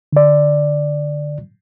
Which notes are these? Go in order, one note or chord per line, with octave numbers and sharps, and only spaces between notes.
D3 D5